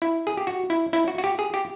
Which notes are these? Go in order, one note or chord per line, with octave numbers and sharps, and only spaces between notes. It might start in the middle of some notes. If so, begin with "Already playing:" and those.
E4
G#4
G4
F#4
E4
E4
F#4
F#4
G4
G#4
G4